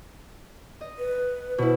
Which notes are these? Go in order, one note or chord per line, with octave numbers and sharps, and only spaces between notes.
D#5
B4
B2 E4 C5